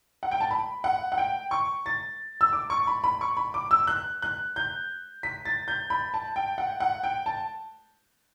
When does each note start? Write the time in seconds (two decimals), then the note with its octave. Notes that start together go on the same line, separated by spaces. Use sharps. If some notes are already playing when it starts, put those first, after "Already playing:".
0.23 F#5
0.31 G5
0.40 A5
0.51 B5
0.84 F#5
1.12 F#5
1.18 G5
1.51 C#6
1.86 A6
2.41 E6
2.53 D6
2.70 C#6
2.87 B5
3.04 B5
3.21 C#6
3.37 B5
3.54 D6
3.71 E6
3.87 F#6
4.22 F#6
4.56 G6
5.23 B6
5.45 A6
5.68 G6
5.90 B5
6.14 A5
6.36 G5
6.58 F#5
6.80 F#5
7.04 G5
7.26 A5